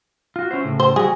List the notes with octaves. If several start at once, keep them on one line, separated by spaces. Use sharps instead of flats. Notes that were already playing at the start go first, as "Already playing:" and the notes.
F4 F#4
C#4 E4 C5
A2 C#3
C5
G3 F#4 G#4